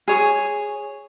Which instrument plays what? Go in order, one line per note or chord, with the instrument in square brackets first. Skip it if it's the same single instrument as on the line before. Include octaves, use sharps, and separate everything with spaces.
[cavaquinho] G#4 C#5 D#6